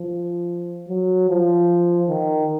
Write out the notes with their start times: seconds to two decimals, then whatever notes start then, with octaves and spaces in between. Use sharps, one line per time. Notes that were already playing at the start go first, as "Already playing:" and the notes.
Already playing: F3
0.88 F#3
1.29 F3
2.09 D#3